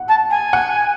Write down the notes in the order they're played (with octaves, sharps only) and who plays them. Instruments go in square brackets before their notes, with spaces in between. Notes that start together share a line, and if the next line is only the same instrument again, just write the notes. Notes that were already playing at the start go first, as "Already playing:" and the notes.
Already playing: [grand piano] F#5
[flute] A5
G#5
[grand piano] F#5